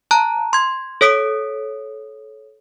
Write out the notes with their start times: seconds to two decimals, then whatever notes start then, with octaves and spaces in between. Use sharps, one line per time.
0.11 A5 A#5 F#6
0.53 C6 G#6
1.01 A4 C#5 D#6 B6 D7